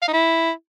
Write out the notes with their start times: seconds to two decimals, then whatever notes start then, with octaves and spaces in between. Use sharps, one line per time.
0.02 F5
0.08 D#4
0.13 E4